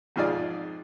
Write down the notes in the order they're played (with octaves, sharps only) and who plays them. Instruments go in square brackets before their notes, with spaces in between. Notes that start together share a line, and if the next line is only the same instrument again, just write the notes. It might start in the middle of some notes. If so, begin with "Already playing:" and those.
[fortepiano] F2 G#2 F4 G#4 D5 D#6